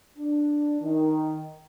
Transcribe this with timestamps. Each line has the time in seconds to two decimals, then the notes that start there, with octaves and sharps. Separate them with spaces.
0.17 D4
0.81 D#3